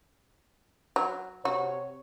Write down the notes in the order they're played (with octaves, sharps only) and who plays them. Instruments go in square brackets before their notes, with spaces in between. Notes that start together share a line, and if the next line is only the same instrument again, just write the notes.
[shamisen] F#3
[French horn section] C3 C#5 [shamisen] F#4